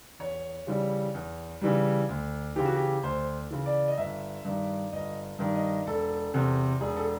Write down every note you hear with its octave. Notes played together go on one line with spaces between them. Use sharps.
E2 C#5
C#3 E3 G3
E2
C#3 E3 G3
D2
C#3 E3 G4
F#4
G4
D2 C5
C#3 E3
D5
D#5
G1 E5
G2 D#3
G1 D#5
G2 D#3
D#5
E1 A4
E2 C3
E1 G#4
A4